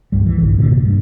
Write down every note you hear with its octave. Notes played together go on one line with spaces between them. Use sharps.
C#2 G2 G3
E3
A#1 G2 D#3
A#2 D3
C3 A#3
G2